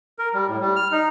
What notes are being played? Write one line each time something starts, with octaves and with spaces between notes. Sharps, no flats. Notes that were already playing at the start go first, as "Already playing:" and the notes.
A#4
G3
A2
G3
F6
D#4